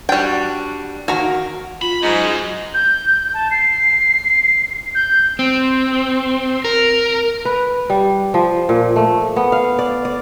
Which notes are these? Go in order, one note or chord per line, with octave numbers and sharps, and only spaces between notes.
G3 D4 F#4 G5
D#3 A#3 F#4 A#5
F4 B5
G#2 F#3 C#4 D#5
G6
A5
C7
G6
C4
A#4
B4
G3
F3
A#2
A3
B3
F5
D5
D5